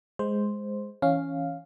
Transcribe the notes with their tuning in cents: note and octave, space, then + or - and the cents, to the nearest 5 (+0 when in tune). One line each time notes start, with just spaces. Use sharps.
G#3 +0 C5 +0
E3 +0 C#4 +0 F5 +0